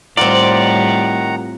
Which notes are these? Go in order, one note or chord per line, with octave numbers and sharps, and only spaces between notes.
A2 D#3 G3 C4 F4 D5 F#5 A#5